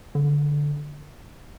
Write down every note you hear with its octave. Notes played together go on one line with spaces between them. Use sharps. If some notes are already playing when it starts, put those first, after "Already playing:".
D3